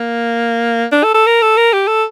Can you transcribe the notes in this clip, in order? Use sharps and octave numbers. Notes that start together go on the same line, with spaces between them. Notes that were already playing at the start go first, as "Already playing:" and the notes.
Already playing: A#3
D4
A4
A4
A#4
A4
A#4
G4
A4